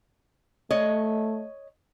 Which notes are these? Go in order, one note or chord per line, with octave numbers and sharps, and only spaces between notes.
A3 C#5 D#5